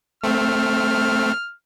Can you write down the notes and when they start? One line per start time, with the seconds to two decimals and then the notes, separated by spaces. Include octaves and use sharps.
0.24 A3 C4 F6